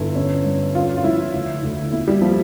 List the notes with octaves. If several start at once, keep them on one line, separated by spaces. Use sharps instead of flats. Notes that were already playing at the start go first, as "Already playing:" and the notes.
Already playing: G1 E4
C#4
G2
C#4 F4
F4
F3 E4
D2
D2
A#3 E4
G3
F3 A#3